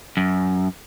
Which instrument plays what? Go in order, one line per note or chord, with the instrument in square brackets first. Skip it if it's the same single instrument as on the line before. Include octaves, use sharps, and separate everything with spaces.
[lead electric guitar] F#2